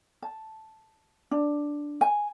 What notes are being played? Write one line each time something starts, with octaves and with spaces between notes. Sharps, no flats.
A5
D4
G#5